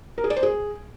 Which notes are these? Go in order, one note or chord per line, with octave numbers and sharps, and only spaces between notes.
A#4
G#4
D5
C5
G#4